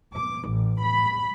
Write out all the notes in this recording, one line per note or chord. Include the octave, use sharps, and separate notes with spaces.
D6
A1
B5